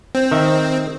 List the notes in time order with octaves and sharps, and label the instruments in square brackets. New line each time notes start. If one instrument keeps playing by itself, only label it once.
[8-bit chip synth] C4
[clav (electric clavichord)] D#3 E5